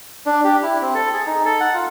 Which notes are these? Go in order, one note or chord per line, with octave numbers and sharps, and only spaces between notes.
D4
G4
E4
C4
A4
G#4
D#4
A4
F#5
F4